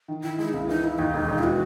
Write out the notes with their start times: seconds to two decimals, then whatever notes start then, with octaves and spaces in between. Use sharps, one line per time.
0.08 D#3
0.23 D#3 E4
0.38 G#3 E4
0.49 D#4
0.53 C#2 E4
0.68 E3 D#4
0.83 E3 E4
0.98 D#2 D#4
1.14 E1
1.28 E1
1.38 E4
1.44 E3 F#4